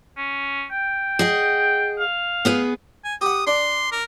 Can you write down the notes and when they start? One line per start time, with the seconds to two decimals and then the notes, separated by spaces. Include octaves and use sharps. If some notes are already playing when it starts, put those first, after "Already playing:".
0.18 C#4
0.71 G5
1.19 G#4 D#5 F#5
2.00 F5
2.45 B3 G#4 B4
3.04 G#5
3.21 G4 F#5 D#6
3.47 D4 C6
3.92 A#4